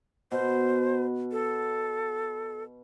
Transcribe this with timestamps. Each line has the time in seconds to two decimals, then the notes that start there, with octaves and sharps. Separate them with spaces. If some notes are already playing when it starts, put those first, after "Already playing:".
0.32 B2 C5
1.32 A4